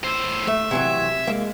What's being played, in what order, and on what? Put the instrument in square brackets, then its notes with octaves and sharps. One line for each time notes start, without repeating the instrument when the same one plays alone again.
[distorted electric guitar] A2 C5 [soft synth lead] E6
[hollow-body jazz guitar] A3 [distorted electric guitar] E5
[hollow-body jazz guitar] C3 E3 F#3 [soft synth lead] G#6
[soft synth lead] G#3 [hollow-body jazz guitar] A#3